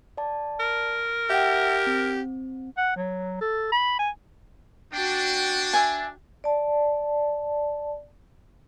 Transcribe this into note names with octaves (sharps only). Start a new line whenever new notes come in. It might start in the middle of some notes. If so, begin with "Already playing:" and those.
D5 A5
A#4
G4 E5 F#5 G5
C4
F#5
F#3
A4
B5
G#5
D4 F#4 G5
E5 G#5
D5 A5